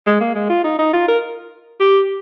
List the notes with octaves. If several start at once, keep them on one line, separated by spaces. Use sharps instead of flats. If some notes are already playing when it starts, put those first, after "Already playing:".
G#3
A#3
G#3
F4
D#4
D#4
F4
A#4
G4